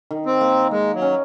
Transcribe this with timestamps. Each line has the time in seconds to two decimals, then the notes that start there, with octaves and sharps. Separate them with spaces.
0.11 D#3
0.26 C4
0.41 A#3
0.71 G#3 A#3
0.95 F#3
1.02 C#4